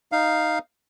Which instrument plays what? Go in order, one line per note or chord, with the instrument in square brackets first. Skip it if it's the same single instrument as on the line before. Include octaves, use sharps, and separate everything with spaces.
[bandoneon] D#4 F5